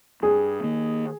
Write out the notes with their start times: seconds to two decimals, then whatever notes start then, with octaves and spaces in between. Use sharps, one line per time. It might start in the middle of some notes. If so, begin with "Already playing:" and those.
0.23 G2 G#4
0.63 D#3 A#3